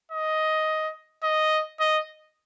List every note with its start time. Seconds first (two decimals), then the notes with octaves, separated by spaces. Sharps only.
0.12 D#5
1.23 D#5
1.80 D#5